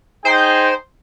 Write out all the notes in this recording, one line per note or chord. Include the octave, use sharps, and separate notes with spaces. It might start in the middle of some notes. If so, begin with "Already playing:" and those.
D#4 G#4 C5 G5